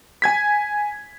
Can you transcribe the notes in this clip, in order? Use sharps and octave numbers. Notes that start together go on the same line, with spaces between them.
G#5 G#6 B6